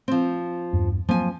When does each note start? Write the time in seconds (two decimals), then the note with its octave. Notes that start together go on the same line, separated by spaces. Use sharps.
0.08 F3 C4
0.73 E2 G2
1.09 F3 F#3 A#3 C4 G#5